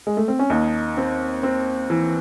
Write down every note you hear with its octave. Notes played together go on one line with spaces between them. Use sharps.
G#3
A3
C4
C#4
D#2 D#4
C4
C4
E3